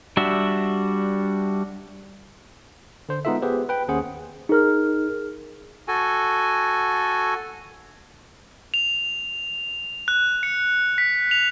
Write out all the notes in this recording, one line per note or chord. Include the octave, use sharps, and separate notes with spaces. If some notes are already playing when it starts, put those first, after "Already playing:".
G3 D4 F#4 E5
D3 C5
G#3 B3 D#4 F4 A4 E5
B3 G4 G#4 B4 C5
B4 G5
D#2 C#4 G#4 C5 F#5
D#4 G#4 A#4 F6
F#4 A4 G#5
F7
F#6
C#7
B6
F7